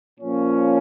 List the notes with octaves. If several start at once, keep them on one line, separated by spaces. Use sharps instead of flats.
A#2 F3 A#3 C#4